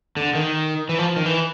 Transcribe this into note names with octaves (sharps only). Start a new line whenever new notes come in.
D3
D#3
E3
F3
D#3
E3